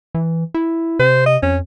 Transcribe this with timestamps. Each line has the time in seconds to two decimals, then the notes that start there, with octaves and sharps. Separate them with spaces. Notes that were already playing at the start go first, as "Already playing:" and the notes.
0.15 E3
0.54 E4
0.99 C3 C5
1.26 D#5
1.43 F2 C#4